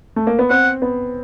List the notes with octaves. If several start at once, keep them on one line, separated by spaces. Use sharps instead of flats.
A3
A#3
B3
C4 F#5
B3